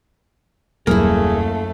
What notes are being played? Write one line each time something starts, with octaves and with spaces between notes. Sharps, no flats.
D#1 F#2 F#3 G3 A3 A#3 E4 G#4